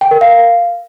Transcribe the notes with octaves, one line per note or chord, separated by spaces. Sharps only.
G5
A#4
F5